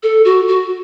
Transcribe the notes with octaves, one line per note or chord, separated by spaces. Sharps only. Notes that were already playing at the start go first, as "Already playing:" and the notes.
A4
F#4
F#4